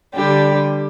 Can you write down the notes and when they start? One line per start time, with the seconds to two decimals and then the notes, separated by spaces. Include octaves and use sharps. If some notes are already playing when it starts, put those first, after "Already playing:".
0.13 D3 G3 D4 G4